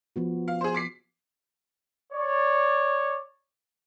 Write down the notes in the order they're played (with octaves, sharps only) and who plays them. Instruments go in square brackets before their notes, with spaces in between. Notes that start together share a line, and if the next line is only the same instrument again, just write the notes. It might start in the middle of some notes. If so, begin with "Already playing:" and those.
[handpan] F3 B3 F#4
[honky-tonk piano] F5
G#4 C5
D6 B6 C7
[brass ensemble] C#5 D5